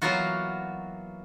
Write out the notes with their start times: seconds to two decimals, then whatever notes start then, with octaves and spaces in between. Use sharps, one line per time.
0.02 E3 F#3 A#3 B3 F4 F#4